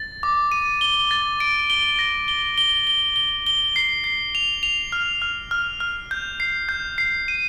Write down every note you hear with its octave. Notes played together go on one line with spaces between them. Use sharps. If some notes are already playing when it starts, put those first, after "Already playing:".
Already playing: A6
D6
D#7
G7
A6
D7
G7
A#6
G7
G7
G7
G7
G7
C7
C7
F7
F7
F6
F6
F6
F6
G6
C7
G6
C7
D#7